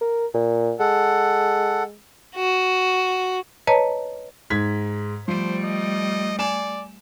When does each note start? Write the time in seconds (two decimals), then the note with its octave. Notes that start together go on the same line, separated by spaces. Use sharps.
0.01 A#4
0.34 A#2
0.80 G#3 A4 F#5
2.35 F#4
3.67 B4 C#5 D#5 A5 A#5
4.50 G#2 G#6 B6
5.28 F3 G3 A3 C5
5.63 D#5
6.39 D5 G#5 E7